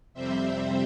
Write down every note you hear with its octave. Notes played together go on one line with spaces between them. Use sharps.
F2 C3 G3 C4 C5 E5